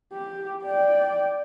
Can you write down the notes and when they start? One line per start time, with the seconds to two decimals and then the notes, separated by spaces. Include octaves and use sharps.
0.13 G4
0.64 D5 G5